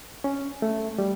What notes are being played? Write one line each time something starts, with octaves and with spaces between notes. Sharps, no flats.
C#4
A3
G3